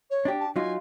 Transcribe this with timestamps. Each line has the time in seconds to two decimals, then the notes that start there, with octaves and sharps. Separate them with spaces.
0.10 C#5
0.25 D4 G4
0.39 A5
0.56 F#3 D#4 F4 G#5